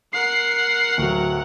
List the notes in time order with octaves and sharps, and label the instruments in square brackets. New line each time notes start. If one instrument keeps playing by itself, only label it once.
[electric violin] A#4 F#5 [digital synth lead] C7
[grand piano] D1 F#3